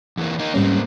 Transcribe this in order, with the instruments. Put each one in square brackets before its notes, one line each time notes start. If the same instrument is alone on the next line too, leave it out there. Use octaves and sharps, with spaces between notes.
[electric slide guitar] E2 E3 A#3
A#3 D#4
[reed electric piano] G#2 G3 C#4 [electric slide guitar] A#3 C4